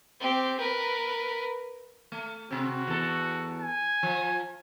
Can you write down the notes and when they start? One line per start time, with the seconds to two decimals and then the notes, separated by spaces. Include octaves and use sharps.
0.20 C4 G4
0.59 A#4 B4
2.12 A3
2.51 C3 C4 F#4
2.87 E2 A4
3.61 G#5
4.03 F3